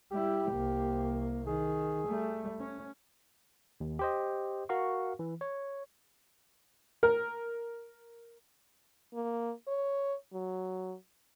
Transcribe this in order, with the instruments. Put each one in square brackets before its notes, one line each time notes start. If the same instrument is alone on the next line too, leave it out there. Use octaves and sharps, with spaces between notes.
[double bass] G3 E4 [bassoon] G4
[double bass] C2 A#3
[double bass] D#3 [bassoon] G#4
[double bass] G3 A3
C#4
[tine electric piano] D#2
G4 C5 D#5
F#4 A#4 F5 C#6
E3
C#5
[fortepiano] A#4
[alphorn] A#3
C#5
F#3